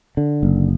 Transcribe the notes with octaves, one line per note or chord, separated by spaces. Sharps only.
D3
F#1